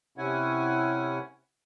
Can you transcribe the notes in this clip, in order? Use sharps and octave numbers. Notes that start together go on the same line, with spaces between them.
C3 C#4 E4 F#5 G#5